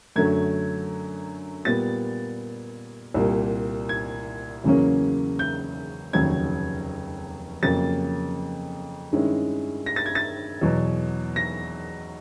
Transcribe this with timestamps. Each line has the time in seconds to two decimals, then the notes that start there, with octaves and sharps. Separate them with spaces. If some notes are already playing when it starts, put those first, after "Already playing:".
0.16 F#2 D3 F#3 A3 G#6
1.65 A#2 G3 B3 A6
3.14 C2 A#2 G3
3.89 G#6
4.64 E2 C#3 F#3 A#3 C#4
5.39 G6
6.13 F1 D#2 C#3 F#3 G#6
7.63 F2 C#3 F#3 A#3 A6
9.12 G2 D#3 G#3 C#4 E4
9.86 A#6
9.96 A6
10.06 G#6
10.15 A6
10.61 E2 B2 F#3
11.36 A#6